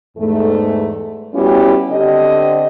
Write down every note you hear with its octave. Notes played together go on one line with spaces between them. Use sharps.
E2 G#2 A3
G3 B3 C#4 E4 F#4 G4
D3 C4 G4 D#5